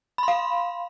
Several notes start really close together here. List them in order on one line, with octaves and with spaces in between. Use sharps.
B5 C6 F5